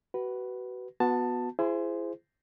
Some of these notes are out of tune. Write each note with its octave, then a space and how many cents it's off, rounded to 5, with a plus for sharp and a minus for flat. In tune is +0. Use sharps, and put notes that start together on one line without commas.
F#4 +30 B4 +0
B3 +0 F#4 -20 A5 +10
E4 +35 G#4 +0 C5 -10